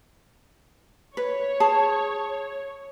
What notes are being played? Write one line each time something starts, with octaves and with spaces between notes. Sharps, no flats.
B4 C#5
G#4 A5